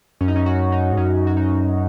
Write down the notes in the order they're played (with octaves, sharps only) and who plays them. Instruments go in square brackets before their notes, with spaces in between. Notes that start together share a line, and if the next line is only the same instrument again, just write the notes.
[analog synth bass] F#2 [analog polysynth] C#4
[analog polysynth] D#4
C#4
F#4
D#4
[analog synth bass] G#2
[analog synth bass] F#2 [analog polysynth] C#4
[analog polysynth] F#4
D#4